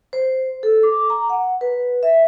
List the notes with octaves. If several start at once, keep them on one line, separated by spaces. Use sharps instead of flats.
C5
A4
D6
A#5
F#5
B4
E5